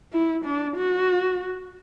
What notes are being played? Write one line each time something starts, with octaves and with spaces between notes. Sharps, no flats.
E4
D4
F#4